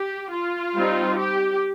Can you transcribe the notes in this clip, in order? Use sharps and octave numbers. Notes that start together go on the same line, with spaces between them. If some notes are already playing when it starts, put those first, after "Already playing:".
Already playing: G4
F4
G3 C4 D#4
G4